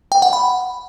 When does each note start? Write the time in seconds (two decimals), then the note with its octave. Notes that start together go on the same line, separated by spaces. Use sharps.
0.12 G5
0.22 F#5
0.33 B5